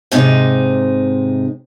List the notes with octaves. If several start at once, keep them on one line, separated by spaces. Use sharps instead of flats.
G#2 C3 D#4